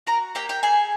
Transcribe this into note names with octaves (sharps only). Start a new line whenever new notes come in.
F#4 A#4 A#5
A#3 G4 G5
G4 G5
G#4 A4 G#5